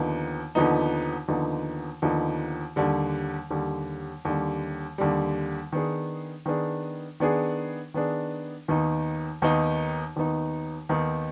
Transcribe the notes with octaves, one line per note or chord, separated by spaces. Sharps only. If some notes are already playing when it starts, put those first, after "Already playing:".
Already playing: D#2 D3 F3 B3 D#4
D#2 D3 F3 B3 D#4
D#2 D3 F3 B3 D#4
D#2 D3 F3 B3 D#4
D#2 D3 G3
D#2 D3 G3
D#2 D3 G3
D#2 D3 G3
D#3 B3 D4 G#4
D#3 B3 D4 G#4
D#3 B3 D4 G#4
D#3 B3 D4 G#4
D#2 D#3 B3 D#4
D#2 D#3 B3 D#4
D#2 D#3 B3 D#4
D#2 D#3 B3 D#4